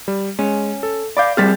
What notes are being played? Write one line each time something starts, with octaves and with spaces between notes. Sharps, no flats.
G3
G#3 C#4
A4
D5 F5 B5 D6 G6
G3 C4 G#4 F6 A6 B6